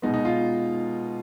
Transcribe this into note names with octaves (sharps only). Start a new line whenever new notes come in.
B2 G#3 B3 D#4
D#4
F4